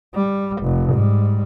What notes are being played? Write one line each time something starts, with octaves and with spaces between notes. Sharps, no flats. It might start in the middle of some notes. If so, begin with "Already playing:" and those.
G3
F1
G#2 G3